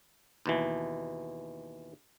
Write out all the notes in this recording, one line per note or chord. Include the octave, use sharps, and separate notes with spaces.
D#2 B2 E3